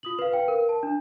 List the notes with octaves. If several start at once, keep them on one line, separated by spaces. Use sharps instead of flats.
F4 D#6 F#7
B4 F5
B4 F5 G5
A#4
A5
D4